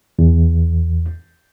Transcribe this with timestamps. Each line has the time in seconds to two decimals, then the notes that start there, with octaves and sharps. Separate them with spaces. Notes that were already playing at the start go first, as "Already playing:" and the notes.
0.19 E2